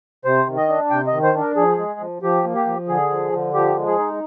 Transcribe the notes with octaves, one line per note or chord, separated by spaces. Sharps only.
C3 C5
D#3
D#5
D4
C3 G5
D#5
D#3
C5
D4
A#4
F3 G#4
G#3
F3
F3 G4
A#3
G4
F3
D3 G#4
F3
D3
F3 G4
G#3
G#4
D#4